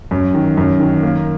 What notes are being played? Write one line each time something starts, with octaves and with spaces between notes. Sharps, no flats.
F#2
D#3
F#2
D#3
A#3